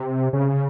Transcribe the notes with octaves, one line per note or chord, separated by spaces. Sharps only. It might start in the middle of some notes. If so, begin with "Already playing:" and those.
Already playing: C3
C#3